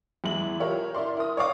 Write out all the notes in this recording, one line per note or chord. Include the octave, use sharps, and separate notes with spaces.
E2 G#3 E4 F#7
F4 G4 A#4 C#5 E5
E4 A#4 D5 C6
E4 A#4 D#6
C#5 D5 F5 D6 D#6